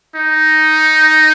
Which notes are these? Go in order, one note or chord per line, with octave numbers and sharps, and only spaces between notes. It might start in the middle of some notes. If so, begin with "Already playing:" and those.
D#4